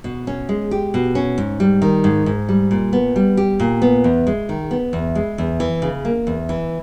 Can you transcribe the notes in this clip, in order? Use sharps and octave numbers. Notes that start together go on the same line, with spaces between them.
B2
C#4
G#3
G4
B2
C#4
G#2
G3
D#3
G#2
G#2
G3
A#2
B3
G3
G4
A#2
B3
E2
G#3
D#3
B3
E2
G#3
E2
E3
C#3
A#3
E2
E3